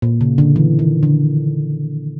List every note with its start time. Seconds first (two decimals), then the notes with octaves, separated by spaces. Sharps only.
0.02 A#2
0.21 C#3
0.38 D3
0.56 E3
0.79 D#3
1.03 D3